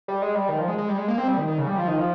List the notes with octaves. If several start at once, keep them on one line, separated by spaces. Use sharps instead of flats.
G3
G#3
G3
D#3
F3
G#3
G#3
G3
G#3
A#3
C4
G3
D#3
D#3
C#3
G3
F3
D#3
F3